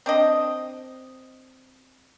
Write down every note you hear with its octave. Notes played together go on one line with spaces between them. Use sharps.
C4 D4 D#5